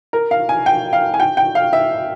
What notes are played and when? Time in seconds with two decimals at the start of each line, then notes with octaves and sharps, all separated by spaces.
0.13 A#4
0.31 F5
0.49 G#5
0.66 G5
0.93 F5
1.14 G#5
1.20 G5
1.37 G5
1.55 F5
1.73 E5